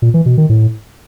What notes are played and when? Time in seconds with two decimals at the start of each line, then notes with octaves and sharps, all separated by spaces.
0.02 A#2
0.14 E3
0.26 B2
0.38 D#3
0.49 A2